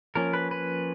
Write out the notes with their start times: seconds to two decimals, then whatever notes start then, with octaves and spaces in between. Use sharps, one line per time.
0.15 F3 A#3 C#4 A#4
0.33 B4
0.51 B4